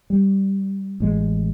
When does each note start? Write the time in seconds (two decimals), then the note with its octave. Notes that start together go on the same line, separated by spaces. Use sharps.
0.10 G3
1.00 A1 G#3